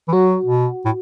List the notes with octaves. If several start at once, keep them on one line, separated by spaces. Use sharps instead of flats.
E3
F#3 F#4
B2
A2